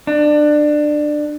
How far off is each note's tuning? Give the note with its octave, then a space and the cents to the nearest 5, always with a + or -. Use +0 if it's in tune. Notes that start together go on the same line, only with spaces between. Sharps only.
D4 +20